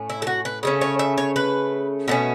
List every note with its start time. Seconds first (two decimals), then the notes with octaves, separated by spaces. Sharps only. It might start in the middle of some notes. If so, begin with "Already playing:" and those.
Already playing: A2 A3 C#4
0.10 E4
0.22 A4
0.27 F#4
0.45 B4
0.63 C#3 A3 C#4
0.81 C#5
0.99 E5
1.18 C#5
1.36 B4
2.08 B2 A3 C#4